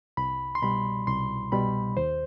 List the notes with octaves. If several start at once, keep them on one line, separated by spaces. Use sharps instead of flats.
C2 B5
C6
B2 G3 B5
C2 C6
B2 G3 B5
D#2 C5